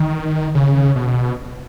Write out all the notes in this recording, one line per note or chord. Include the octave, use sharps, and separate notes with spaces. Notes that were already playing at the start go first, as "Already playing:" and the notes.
Already playing: D#3
C#3
B2